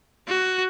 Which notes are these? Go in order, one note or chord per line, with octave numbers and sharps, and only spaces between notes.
F#4